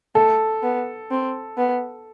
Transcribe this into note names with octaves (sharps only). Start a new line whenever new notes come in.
A3 A4
B3
C4
B3